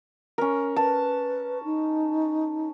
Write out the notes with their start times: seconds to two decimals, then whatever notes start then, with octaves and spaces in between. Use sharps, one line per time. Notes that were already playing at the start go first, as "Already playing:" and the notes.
0.38 C#4 A#4
0.76 B4 A5
1.64 D#4